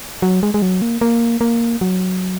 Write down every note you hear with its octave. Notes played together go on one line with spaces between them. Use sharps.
F#3
G#3
G#3
F#3
A#3
A#3
A#3
F#3